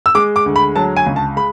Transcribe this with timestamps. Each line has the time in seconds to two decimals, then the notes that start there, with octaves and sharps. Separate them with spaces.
0.06 E6
0.15 G#3 D6
0.36 D6
0.46 D2
0.56 B5
0.76 F#3 A5
0.96 G#5
1.06 C#2
1.16 A5
1.36 G#3 B5